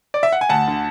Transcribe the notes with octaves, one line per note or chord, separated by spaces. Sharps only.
D5
E5
F#5
G#5
D2 F#5 A5
D3